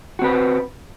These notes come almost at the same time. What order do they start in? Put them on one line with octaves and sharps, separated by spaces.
F#4 C4 B4